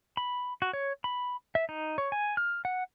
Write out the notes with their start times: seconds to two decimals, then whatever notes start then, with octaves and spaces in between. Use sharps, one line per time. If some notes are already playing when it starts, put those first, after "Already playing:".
0.17 B5
0.62 F#4
0.73 C#5
1.04 B5
1.55 E5
1.69 D#4
1.98 C#5
2.12 G#5
2.37 F6
2.65 F#5